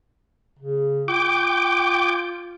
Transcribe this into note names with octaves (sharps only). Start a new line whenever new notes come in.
C#3
F4 G5 D6